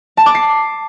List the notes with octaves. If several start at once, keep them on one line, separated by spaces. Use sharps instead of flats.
A5
D6
C7